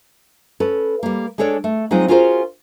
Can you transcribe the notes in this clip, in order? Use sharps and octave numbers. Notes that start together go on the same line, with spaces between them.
C#4 A4 B4
G3 A#3
G#3 D4 A4 C#5 D5
A3
F#3 G#3 C4 D#4 F4
C#4 F4 F#4 G#4 A#4 C5